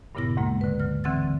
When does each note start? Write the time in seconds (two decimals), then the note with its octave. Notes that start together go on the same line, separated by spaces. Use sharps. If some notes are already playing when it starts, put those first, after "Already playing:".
0.15 G2 A#2 C#3 B3 E4 A#6
0.37 D2 G#2 G#3 A#3
0.61 D3 B4
0.80 F#3 F6
1.04 D3 E3 C4 F#5 E6 A6